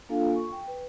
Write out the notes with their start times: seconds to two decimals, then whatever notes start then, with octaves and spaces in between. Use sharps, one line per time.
0.09 A#3 D4 F4 A4 F5 G#5
0.35 C#6
0.52 G5
0.67 B4